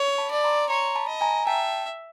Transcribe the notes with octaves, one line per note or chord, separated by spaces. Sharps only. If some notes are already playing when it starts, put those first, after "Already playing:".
Already playing: C#5
A5 B5
D5
A#5 C6
C#5 A#5 C6
A5 B5
D#5
G#5 A#5
E5 G5 A5